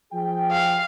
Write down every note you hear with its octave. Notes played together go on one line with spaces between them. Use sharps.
F3 G#4 G5
F5